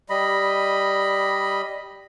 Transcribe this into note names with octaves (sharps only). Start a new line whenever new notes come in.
G3 D#5 B5